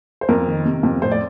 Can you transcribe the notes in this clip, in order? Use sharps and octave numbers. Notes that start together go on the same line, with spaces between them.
C5
F2 A#4
D#3
C3
F2
A2 C5
D5